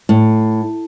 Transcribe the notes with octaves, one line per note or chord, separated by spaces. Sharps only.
A2